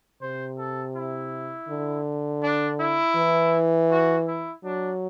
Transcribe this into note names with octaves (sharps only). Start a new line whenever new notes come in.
C3 C5
A4
E4
D3
D4
E4
E3
F#4
E4
F#3 D4